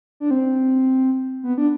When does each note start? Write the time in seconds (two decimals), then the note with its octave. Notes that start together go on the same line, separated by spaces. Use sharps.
0.20 D4
0.31 C4
1.43 B3
1.58 D4